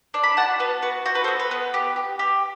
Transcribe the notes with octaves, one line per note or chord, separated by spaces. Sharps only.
D4
B5
F#4 F#5 A5
B3 B4
F#4 B4
F#4 C5
B4
A4 C5
B3
B4
B3
G4
G4
G4